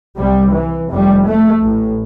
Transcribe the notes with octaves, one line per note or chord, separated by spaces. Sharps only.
C2 C3 G3
E3
F1 F2 C3 G3
A3
A1 A2